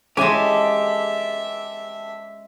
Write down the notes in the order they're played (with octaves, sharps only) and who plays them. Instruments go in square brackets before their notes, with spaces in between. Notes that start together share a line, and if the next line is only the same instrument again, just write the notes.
[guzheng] G#3 G#5 [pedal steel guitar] G4 A4 [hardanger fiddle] E5 [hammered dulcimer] D6